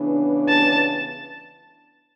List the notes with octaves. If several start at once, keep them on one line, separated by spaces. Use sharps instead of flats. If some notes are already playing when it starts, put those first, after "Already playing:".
Already playing: C#3 E3 B3 D4
A5